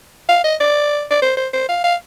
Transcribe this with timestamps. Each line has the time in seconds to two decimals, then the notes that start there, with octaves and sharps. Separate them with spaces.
0.29 F5
0.44 D#5
0.60 D5
1.11 D5
1.22 C5
1.37 C5
1.53 C5
1.69 F5
1.84 F5